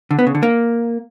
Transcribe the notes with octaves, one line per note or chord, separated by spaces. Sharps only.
D3
B3
C#3
D3
A#3